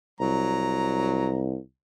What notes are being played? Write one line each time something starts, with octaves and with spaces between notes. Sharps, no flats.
C2 F#3 A#5